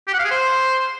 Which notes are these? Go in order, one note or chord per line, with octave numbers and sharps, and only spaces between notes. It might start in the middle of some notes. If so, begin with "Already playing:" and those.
G4
F#5
F5
G#4
C5